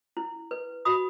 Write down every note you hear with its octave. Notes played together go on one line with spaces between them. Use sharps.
E4
B4
F#4 B5 D#6